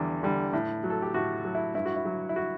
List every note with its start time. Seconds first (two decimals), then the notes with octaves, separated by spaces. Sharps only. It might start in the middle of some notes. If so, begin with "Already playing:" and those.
Already playing: E2 D3 G3
0.23 D3 G3
0.53 A2
0.84 F#3
0.90 A4
1.02 G4
1.14 A2 F#4
1.45 F#3
1.55 E4
1.75 G2 E4
1.85 F#4
1.96 E4
2.05 F#3
2.29 E4
2.36 F#4